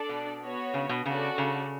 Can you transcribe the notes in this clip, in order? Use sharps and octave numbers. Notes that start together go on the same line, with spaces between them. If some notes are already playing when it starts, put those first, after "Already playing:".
Already playing: D4 A4 D5
B2
B3 F#4 C#5
C#3
B2
C#3 C#4 F#4 A4 D5
C#3